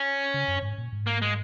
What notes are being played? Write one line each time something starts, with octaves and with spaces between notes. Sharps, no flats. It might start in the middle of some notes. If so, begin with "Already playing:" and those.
Already playing: C#4
C#3
F#2
G#2
A#2
G#2
A#3
G#3